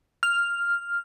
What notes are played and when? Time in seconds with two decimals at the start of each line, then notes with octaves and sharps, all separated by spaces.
0.23 F6